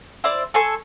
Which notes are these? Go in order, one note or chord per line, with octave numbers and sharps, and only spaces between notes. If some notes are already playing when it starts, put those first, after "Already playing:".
E4 C5 D5
A4 G#5 C6 C#6